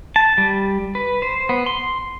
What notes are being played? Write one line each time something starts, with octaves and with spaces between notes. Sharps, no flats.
A5
G3
B4
C5
B3
C6